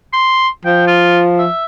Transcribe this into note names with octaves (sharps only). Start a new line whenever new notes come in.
C6
F3 G5
F4
E5